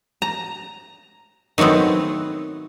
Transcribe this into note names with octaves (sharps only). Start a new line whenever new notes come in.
A#5
D#3 F#3 A3 B3 C4